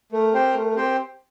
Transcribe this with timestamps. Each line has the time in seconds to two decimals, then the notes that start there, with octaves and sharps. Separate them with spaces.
0.12 A3 A#4
0.33 C4 G4 C5 G5
0.54 A3
0.75 C4 G4 C5 G5